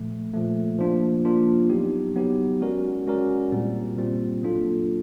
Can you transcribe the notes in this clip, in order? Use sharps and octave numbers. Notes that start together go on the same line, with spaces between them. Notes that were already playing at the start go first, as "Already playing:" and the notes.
Already playing: A#2 F3 A3
A#2 F3 A3
F3 A#3 D4 F4
F3 A#3 D4 F4
F#3 B3 D#4 G4
F#3 B3 D#4 G4
G#3 C#4 F#4 A#4 D5
G#3 C#4 F#4 A#4 D5
A#2 G3 C4
A#2 G3 C4
F#3 A#3 D4 F4 A4